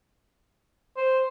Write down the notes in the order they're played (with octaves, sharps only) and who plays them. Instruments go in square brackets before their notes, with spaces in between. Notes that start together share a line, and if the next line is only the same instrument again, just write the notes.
[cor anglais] C5